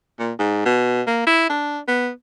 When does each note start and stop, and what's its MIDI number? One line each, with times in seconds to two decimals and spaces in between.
0.19 0.32 46
0.39 0.63 44
0.66 1.02 47
1.07 1.23 58
1.27 1.47 64
1.50 1.79 62
1.88 2.10 59